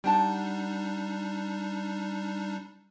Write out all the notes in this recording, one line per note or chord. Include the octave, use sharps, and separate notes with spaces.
G3 D4 D#4 G4 F#5 A5